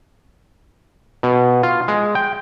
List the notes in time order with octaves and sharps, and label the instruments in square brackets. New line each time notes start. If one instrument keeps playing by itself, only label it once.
[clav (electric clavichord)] B2
F4
G#3
G5